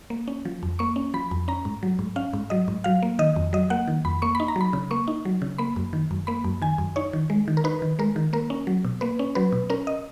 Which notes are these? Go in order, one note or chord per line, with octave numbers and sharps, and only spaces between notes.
A#3
C#4
F3
F2
A#3 C#6
C#4
F3 B5
F2
C#4 A#5
G#2
F#3
G#2
C#4 F5
G#2
F#3 D#5
G#2
F#3 F5
A#3
D#3 D#5
F2
F#3 D#5
A#3 F#5
D#3
F2 B5
A#3 C#6
D#4 B5
A#5
F#3 B5
C#3
A#3 C#6
D#4
F#3
C#3
A#3 B5
F#2
D#3
F#2
A#3 B5
F#2
D#3 G#5
F#2
D#4 C#5
D#3
G#3
D#3
A#4
D#4 B4
D#3
G#3 A#4
D#3
A#3 A#4
C#4
F#3
B2
A#3 B4
C#4
F#3 B4
B2
C#4 A#4
D#5